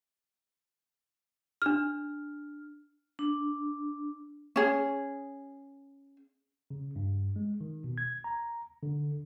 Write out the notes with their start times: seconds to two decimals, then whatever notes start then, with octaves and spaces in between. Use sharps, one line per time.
1.62 D4 F6
3.19 D4
4.56 C#4 G#4
6.71 C#3
6.96 G2
7.36 G#3
7.61 D#3
7.84 B2
7.98 G#6
8.24 A#5
8.83 D3